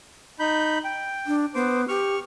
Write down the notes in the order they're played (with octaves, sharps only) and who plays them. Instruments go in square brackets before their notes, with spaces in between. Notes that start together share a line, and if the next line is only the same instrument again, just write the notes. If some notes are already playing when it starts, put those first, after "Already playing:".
[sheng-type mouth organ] D#4 B5 G6
G5
[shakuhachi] D4
[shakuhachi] B3 [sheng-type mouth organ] C5 D6
[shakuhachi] G4 [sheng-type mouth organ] C#6 F6